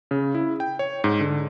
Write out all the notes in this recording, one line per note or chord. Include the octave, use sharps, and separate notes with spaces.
C#3
E4
G5
C#5
G#2
D3